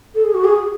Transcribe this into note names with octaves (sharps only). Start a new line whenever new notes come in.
A4
G#4
F#4
G#4